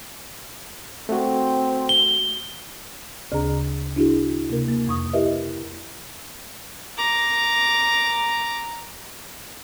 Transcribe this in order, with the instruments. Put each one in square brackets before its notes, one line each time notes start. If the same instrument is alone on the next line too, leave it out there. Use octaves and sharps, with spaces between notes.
[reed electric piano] A3 F#4 [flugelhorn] C4
[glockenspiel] G7
[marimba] D2 C#3 D4 G#4 A#5
D4 E4 F#4 G#4
C3 A#3 A#4
A#3
F2 C#6 D#6
E4 G4 A#4 B4 D#5 E5
[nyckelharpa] A#5 D6